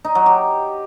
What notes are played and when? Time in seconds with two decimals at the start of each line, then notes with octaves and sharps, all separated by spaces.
0.04 D#4
0.15 F#3
0.26 G4